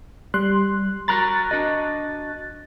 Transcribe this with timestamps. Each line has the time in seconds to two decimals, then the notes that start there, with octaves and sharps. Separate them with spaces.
0.34 G3 C6 F#6
1.08 F#4 A#4 A#5 F#6 A6
1.51 D4 F#4 D#5